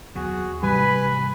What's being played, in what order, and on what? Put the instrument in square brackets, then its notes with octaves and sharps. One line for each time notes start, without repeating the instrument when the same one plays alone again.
[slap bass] D#2 F#3 B3 [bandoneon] F#4 G#4
[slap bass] G#2 C3 E3 [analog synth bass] G3 [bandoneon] B4 G#5 [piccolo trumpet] B5